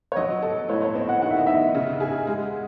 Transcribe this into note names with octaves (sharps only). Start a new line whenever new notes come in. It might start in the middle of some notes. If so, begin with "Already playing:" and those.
C#5
F#3 D#5
A4 D#5
A2 C#5
C#5
C4 D#5
F#5
D#3 F#5
E5
D#5
D#4 E5
C#3
G#4
G#3